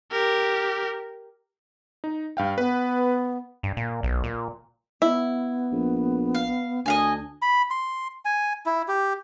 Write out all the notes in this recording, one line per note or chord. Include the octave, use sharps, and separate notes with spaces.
G4 A#4
D#4
G2 F5 G5
B3 B4
G2
A#2
B1
A#2
B3 E4
A#1
F5
D2 D4 D#5 F5 G#5
B5
C6
G#5
E4
G4